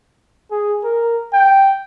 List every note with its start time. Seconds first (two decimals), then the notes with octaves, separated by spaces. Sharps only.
0.51 G#4
0.84 A#4
1.33 G5